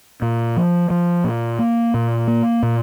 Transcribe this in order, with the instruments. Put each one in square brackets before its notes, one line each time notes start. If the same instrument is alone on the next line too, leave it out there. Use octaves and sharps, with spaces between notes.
[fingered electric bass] A#2
F3
F3
A#2
A#3
A#2
A#3
A#2